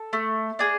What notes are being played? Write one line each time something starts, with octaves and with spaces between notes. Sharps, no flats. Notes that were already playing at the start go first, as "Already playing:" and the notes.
Already playing: A4
A3
D4 G#4